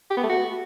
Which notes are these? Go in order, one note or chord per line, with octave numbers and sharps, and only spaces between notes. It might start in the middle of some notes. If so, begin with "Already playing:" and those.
G4
B3
A3
F#4